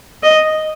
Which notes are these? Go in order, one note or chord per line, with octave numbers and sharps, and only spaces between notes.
D#5